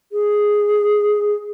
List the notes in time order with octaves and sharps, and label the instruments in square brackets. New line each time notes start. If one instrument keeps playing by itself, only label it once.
[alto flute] G#4